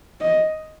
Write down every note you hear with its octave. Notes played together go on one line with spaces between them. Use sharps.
D#5